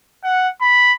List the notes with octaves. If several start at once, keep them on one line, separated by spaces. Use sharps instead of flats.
F#5
B5